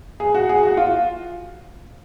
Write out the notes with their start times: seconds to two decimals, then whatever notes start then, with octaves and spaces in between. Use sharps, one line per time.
0.20 G#4
0.34 F#4
0.49 G#4
0.63 F#4
0.77 F4